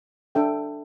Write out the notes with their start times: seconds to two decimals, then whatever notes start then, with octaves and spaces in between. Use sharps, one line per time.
0.35 D4 A4 E5 G5